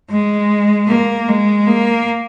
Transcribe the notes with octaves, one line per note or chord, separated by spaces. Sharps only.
G#3
A#3
G#3
A#3